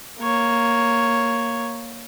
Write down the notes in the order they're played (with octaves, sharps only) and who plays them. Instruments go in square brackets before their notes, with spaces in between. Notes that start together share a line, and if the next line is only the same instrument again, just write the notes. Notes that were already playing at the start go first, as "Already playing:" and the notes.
[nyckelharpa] A#3 C#5